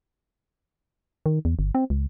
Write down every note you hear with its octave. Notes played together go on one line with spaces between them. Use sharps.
D#3
E2
G1
C4
C#2